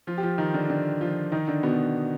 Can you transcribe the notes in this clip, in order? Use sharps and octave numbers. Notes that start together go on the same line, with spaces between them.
F3 F4
G4
F3 F4
D#3 D#4
D3 D4
D3 D4
F3 F4
D#3 D#4
D3 D4
B2 B3